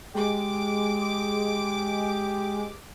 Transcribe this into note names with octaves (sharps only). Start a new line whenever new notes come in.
G#3 G4 D6